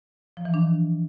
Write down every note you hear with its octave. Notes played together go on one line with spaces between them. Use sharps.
F3
E3
D4
D#3